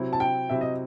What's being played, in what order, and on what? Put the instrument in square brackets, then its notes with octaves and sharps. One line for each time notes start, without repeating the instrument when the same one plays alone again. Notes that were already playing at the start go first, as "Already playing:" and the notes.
Already playing: [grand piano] C3 F#3 C4 E4
[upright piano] A5
G5
[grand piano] C3 F#3 C4 E4 [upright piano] E5
[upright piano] D#5